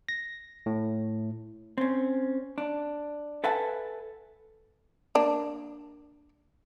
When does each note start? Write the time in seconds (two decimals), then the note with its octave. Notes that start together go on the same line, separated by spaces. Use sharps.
0.09 A#6
0.66 A2
1.78 C4 C#4
2.58 D4
3.44 A4 B4 E5 F#5 G#5 A5
5.15 A#3 D4